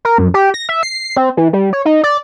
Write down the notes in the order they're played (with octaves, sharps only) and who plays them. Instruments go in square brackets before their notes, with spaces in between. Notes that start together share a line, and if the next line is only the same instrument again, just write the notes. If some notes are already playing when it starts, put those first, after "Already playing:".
[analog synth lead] A#4
F#2
G4
A#6
E5
C7
C4
E3
G3
C#5
D#4
D5